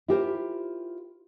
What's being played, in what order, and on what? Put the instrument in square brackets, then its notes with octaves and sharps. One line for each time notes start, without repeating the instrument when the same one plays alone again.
[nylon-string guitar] E4 F4 G4 A#4 C5